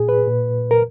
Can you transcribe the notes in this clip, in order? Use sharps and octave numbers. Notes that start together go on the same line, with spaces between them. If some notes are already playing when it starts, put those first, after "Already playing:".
Already playing: A#2 G#4
B4
A#2
A#4